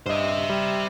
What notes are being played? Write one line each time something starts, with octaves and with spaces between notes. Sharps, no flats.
G2 C5 D#5 E5
G3